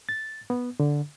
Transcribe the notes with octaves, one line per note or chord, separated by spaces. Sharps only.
A6
B3
D3